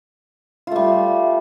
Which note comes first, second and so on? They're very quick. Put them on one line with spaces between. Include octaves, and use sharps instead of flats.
F4 A3 G3